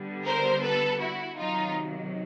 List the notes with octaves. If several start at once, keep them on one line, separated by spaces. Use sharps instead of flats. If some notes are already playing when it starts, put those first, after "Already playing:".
Already playing: D3 G3 B3
A#4 C5
A4 B4
E4 F#4
C3 D#3 F#3 D#4 F4